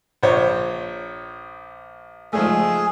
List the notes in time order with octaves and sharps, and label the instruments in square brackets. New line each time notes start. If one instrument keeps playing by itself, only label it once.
[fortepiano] A#1 C5 C#5
[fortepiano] F3 G#3 A3 [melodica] G#4